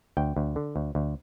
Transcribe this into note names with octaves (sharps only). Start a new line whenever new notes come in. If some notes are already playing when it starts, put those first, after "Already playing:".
D2 G5
D2
D3
D2
D2